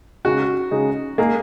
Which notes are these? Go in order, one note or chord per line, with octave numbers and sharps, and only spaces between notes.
C#3 G#3 D#4 F#4 G#4
C#3 G#3 D#4 G#4
G#3 A#3 D#4 G#4